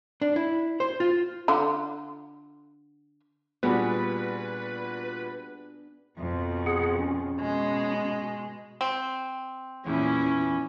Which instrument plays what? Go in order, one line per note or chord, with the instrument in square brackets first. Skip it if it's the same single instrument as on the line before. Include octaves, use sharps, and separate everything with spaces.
[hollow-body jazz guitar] D4
E4
C5
F4
[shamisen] D3 F4
[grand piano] A#2 G3 F#4 [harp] B3 D4 G#4 [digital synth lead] B4
[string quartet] F2 B2
[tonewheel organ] G#4 F#5
C#4
[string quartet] B2 G#3
[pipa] C4
[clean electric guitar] E2 [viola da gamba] A#2 A#3 E4 [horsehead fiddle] C#4